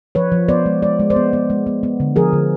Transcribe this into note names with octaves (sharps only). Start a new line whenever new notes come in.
F3 B4 C#5
F3
B3 C5 D5
G#3
G#3 D5
G#3
C5 D5
B3
B3
G#3
B3
B3
D3
F3 G#4 A#4
D3